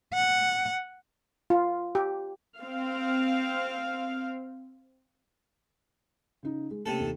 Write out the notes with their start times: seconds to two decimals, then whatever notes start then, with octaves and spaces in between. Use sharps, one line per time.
0.14 F#5
1.50 F4
1.95 G4
2.58 C4 F5
6.43 C#3 D#4
6.71 G#3
6.86 C3 A3 A#3 C#4 A4
7.00 D#2 D#3